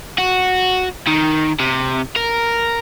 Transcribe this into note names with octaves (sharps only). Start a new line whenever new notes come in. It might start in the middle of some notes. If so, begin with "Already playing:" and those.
F#4
D#3
C3
A#4